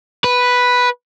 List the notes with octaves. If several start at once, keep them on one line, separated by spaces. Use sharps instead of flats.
B4